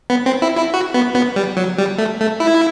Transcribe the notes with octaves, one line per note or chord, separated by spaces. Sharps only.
B3
C4
E4
E4
F#4
B3
B3
G3
F#3
G3
A3
A3
E4